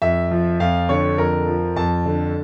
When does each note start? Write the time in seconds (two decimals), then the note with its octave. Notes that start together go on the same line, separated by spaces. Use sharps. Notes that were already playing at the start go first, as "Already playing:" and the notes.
0.02 F2 E5
0.31 F3
0.60 F2 F5
0.89 D3 C#5
1.18 F2 A#4
1.47 F3
1.76 F2 A5
2.06 D3